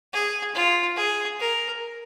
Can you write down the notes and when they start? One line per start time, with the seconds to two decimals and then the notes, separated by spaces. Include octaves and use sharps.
0.13 G#4
0.54 F4
0.97 G#4
1.40 A#4